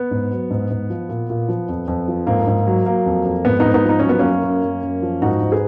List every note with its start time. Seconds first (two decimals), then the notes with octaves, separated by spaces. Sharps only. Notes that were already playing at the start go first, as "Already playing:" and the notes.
Already playing: B3
0.11 G#2
0.31 F#3
0.50 G#2
0.70 G#2
0.90 F3
1.09 A#2
1.30 A#2
1.49 F3
1.69 F2
1.88 F2
2.08 F3
2.27 G#2 A#3
2.47 G#2
2.67 F#3
2.86 F#3 A#3
3.06 F2
3.25 F2
3.45 G#2 B3
3.60 B3 D#4
3.65 G#2
3.74 B3 D#4
3.84 F3 D#4
3.99 C#4
4.05 F#3 B3
4.19 F#2 A#3 C#4
4.44 F#2
4.63 F#2
4.83 F#2
5.02 F3
5.22 G#2 D#4 F#4
5.42 G#2
5.51 G#4 B4